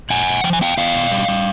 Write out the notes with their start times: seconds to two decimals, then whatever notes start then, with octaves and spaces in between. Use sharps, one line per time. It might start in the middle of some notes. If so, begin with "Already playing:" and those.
0.10 A#2 F#5 G#5
0.27 A#2
0.44 F3 G5
0.53 G#5
0.61 B3 F5 G5
0.77 B3 F5 G5
0.94 B2
1.11 G3
1.28 G3